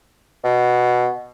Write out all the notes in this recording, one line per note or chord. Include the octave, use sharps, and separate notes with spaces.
B2